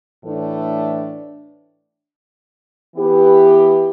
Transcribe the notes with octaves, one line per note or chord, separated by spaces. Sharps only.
A2 E3 A3 D4
E3 B3 E4 G4 B4